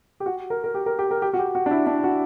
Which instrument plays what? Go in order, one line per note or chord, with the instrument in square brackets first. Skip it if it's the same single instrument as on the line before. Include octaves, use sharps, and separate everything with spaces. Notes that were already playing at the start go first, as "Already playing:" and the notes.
[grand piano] G4
F#4
A#4
A#4
G4
A#4
G4
A#4
G4
F#4
G4
F#4
D4
E4
D4
F#4